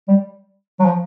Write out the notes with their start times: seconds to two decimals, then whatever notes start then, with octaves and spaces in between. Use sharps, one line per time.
0.08 G3
0.80 F#3
0.85 F3